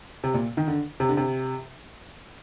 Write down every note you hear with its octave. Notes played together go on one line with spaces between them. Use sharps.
C3
A#2
D#3
D3
C3
D3
C3